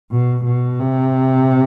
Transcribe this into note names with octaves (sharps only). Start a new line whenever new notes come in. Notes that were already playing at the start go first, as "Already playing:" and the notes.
B2
B2
C3